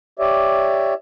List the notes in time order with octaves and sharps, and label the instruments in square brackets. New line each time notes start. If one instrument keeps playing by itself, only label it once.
[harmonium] G4 C#5 D5 E5